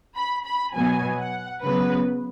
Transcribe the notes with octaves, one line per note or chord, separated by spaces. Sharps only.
B5
B5
B2 F#3 B3 G#5
F#5
C#3 F#3 B3 B4